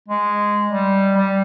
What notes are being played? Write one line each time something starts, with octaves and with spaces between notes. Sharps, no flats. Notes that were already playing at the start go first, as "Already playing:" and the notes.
G#3
G3
G3